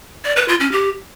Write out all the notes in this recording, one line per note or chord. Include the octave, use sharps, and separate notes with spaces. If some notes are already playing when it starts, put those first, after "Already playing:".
D5
B4
F4
C#4
G4